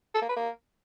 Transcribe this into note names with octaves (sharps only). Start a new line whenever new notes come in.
A4
A#3
B4
A#3